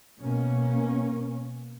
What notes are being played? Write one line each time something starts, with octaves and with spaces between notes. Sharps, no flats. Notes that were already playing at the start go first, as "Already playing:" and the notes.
B2 A#3 C#4